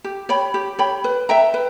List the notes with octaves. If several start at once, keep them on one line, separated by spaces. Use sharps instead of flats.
G4
C#5 G5 B5
G4
C#5 G5 B5
B4
E5 G5 A#5
B4